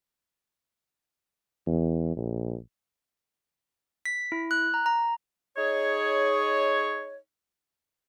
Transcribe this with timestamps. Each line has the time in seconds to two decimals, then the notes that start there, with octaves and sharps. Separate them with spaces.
1.67 E2
2.17 A#1
4.05 B6
4.32 E4
4.51 F#6
4.74 A#5
4.86 A#5
5.57 D#4 G#4 C#5